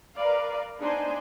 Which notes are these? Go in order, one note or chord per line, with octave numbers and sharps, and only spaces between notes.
A#4 B4 D5 F5
B3 D4 D#4 C5 G#5